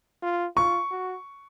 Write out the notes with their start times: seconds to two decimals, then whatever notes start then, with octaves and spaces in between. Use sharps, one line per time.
0.22 F4
0.56 F4 C#6
0.91 F#4